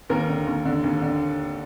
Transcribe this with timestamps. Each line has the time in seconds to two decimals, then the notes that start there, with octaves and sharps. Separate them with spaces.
0.10 D#2 A#4
0.29 D3
0.47 D#2
0.65 D3
0.84 D#2
1.02 D3